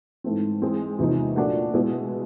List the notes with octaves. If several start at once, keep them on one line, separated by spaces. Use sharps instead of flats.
G#2 E3 A3 C4
E3 G#3 C4
E2 C3 F3 A#3 D#4
A#2 F3 A3 D4 F#4
B2 G#3 B3 E4